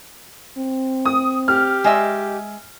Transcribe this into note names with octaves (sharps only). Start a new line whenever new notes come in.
C4
D#6
G4 F6
G#3 D#5 E5